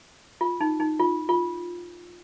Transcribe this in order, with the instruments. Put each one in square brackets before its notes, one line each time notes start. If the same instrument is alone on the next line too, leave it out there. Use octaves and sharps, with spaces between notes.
[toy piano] F4
D#4
D#4
F4
F4